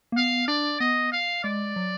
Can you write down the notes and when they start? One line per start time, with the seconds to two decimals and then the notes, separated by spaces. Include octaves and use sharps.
0.12 A#3
0.16 B3 F5
0.48 D4 D5
0.80 B3 D#5
1.13 F5
1.44 G#3 D5
1.76 F#3